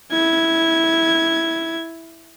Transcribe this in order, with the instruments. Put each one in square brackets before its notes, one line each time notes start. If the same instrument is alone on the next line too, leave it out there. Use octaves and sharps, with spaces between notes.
[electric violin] E4 G#6